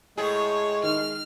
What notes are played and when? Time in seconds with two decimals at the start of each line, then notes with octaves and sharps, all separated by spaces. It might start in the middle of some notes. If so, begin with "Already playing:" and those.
0.18 A2 G#3 G#4 C#5
0.84 D#3 F6